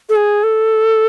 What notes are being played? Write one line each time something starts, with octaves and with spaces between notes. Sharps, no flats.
A4
G#4
A4